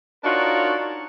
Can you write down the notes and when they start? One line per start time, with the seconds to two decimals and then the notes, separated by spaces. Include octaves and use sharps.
0.24 D4 D#4 F4 F#4 A#4 C#5